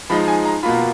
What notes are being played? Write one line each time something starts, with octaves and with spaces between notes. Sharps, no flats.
F3 G#3 D#4 B5
G#5
A#5
B2 A#3 F4 B5